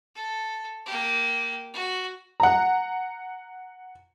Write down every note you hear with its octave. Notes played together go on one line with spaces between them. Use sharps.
A4
A#3 G4
F#4
F#5 A#5